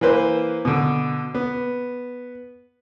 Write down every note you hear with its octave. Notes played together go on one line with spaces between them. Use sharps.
E3 A#3 B4 C5
B2 D3
B3